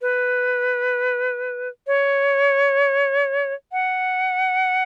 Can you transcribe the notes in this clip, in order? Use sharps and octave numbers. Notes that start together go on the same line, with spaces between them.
B4
C#5
F#5